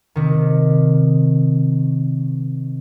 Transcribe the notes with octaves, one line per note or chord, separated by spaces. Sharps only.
C3 D#3